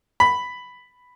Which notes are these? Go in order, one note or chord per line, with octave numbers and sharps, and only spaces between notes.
B5